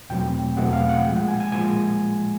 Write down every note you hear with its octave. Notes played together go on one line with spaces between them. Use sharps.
E2 B2 F#3 A3 C4 G5
E2 B2 F#3 A3 C4 F#5
F5
F#5
A#2 F3 G#3 G5
F#5
G#5
G#5
A#2 F3 G#3 G#5